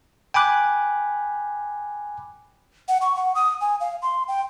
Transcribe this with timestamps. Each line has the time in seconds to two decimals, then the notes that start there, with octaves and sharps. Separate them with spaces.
0.34 G5 G#5 B5 D6 F#6
2.88 F#5
3.01 C#6
3.16 F#5
3.35 D#6
3.61 G#5
3.80 F5
4.02 C6
4.28 G5